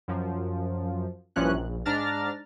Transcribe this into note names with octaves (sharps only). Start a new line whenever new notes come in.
F#2 F3
A#1 G2 E3 F3 C#4 F#6
A#1
G#2 D4 A#5 F6 A6